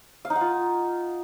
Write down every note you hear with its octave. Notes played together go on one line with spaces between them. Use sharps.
F5
D#4
F#5
F4